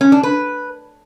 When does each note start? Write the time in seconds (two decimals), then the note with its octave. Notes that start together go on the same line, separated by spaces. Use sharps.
0.01 C#4
0.12 D4
0.23 B4